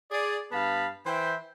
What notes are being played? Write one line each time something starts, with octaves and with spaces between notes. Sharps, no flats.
G#4 D5
G2 B3 F5 A5 B5
E3 C5 E5 G5